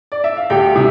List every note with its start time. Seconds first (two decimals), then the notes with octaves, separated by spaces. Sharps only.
0.12 D5
0.24 E5
0.37 F5
0.50 D2 G4 G5
0.76 C3